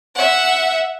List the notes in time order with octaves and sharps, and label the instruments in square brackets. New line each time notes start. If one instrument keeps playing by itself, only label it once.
[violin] E5 F#5